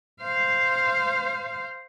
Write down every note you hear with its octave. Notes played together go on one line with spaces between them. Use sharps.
C5 F5